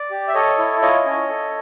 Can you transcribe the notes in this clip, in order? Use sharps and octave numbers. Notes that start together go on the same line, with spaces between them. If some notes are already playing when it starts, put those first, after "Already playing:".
Already playing: D5
G4
E5
A4 C#5 D#5
E4
F4 C#5 D#5
C#4
A4